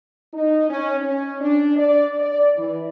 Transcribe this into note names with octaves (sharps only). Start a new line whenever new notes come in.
D#4
C#4
C#4
D4
D5
D5
E3